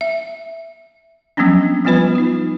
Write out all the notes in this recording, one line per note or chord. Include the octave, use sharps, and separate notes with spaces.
E5
F3 F#3 A#3 B3 C#4 D4
F3 G3 B3 F4 B4 B5
D#4 F4